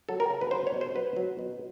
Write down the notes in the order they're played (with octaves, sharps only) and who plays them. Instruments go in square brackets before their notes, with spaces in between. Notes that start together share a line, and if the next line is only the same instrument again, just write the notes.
[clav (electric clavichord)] F#3 A4
A#4
C#3
B4
F#3 C5
C#5
B2
C5
F#3 B4
F#3
B2